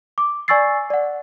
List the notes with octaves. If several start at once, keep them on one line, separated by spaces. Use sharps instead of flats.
D6
D5 G#5 C#6 E6 A6 C7
D5 F#5